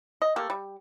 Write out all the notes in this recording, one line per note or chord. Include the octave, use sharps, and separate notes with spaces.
D#5
A3 A#3 G4
G3